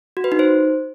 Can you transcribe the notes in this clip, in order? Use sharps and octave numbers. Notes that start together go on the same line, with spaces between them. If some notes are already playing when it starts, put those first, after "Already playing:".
F#4
B4
D#4
C5